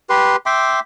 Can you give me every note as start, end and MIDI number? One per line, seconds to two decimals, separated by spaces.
0.10 0.36 67
0.10 0.36 71
0.10 0.36 84
0.46 0.80 76
0.46 0.80 79
0.46 0.80 84
0.46 0.80 86